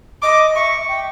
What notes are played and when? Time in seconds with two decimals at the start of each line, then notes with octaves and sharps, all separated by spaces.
0.22 D#5 D6
0.56 E5 C#6
0.88 G5